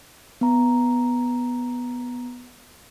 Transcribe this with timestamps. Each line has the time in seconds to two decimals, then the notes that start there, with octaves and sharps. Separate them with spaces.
0.41 B3 A#5